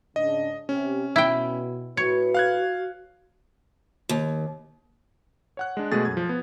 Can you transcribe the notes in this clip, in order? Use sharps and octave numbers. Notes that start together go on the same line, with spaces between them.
G#2 C#3 D4 D#5
C3 C#4 G4
B2 E4 G5
A2 F#4 B4 C#5 C#7
F5 F#6 G#6
D#2
C#5 F#5 F#6
G#3 D4
B2 G#3 A3 G#4 A6
F#2 G#6
F3
B3